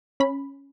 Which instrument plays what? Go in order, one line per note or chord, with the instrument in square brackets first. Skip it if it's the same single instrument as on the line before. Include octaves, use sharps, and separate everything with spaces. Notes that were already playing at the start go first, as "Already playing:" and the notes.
[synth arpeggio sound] C#4 B5